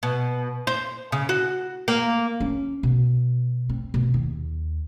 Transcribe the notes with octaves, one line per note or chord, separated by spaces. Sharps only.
B2
C5
C#3
F#4
A#3
C#4
B2
C4
B2
D#2